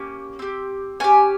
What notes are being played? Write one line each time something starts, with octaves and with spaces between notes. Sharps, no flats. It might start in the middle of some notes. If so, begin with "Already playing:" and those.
Already playing: A#3 C#4 G4
C4 G4
C#4 G4 G#5